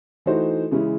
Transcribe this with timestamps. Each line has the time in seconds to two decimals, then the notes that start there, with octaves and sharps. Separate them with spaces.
0.26 E3 A3 D#4 F#4 C5
0.71 C#3 E3 G#3 C#4 E4